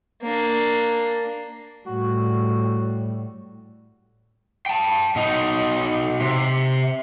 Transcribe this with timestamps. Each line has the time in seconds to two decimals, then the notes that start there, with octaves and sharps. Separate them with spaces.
0.22 A#3 D4
1.86 A2 G3 F#4
4.66 G5 A5
5.16 B2 D#4
6.20 C3